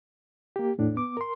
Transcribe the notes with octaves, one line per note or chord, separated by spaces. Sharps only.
A#3 G4
E2 A2 D4
B3 D6
A#4 C6